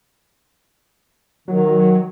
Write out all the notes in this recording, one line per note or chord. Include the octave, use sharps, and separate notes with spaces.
D#3 F#3